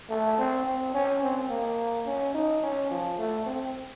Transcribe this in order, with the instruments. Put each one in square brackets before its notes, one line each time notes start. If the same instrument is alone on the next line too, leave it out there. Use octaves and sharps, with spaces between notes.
[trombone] A3
C4
C4
C#4
C4
A#3
C#4
D#4
C#4
F3
A3
C4